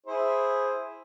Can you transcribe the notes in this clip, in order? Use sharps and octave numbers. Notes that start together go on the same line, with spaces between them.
E4 G#4 C5